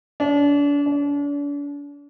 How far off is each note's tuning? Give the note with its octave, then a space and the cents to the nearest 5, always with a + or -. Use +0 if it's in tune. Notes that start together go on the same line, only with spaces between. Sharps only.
D4 -35
D4 -40